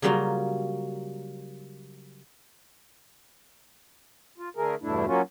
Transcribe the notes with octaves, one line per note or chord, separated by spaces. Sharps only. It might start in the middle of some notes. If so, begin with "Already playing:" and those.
C#3 F#3 G3 A#3 F4 F#4
F4
D3 A3 G#4 A#4
E2 G2 B2 A3 D4 E4
F#3 A#3 C#4 F4 F#4